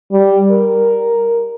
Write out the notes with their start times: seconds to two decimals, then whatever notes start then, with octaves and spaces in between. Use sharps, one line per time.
0.12 G3
0.50 A#4